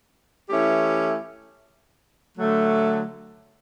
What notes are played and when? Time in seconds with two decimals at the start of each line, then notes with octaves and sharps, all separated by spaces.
0.49 E3 A3 C#4 E4 G4
2.38 D3 F#3 A3